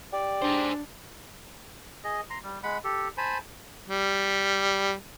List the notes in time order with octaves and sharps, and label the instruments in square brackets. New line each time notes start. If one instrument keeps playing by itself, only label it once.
[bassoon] G4 [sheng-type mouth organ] D5
[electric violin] D4 [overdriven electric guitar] G#4 C5
[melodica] G#4 D#5
A#5 C6
G3
G#3 F#5 B5
G4 A4
C5 G#5 A5 B5
[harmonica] G3